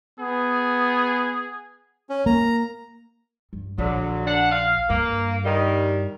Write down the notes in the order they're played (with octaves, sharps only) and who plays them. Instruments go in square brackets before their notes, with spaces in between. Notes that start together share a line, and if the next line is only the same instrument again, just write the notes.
[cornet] B3 [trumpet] G#4
[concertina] C#4
[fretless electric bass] A#3 [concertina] A#5
[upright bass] G2
[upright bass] A#1 [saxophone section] D3 F#3
[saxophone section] D3 D4 F#5
F5
[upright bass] G2 [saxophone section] A#3
[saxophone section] D#3 G3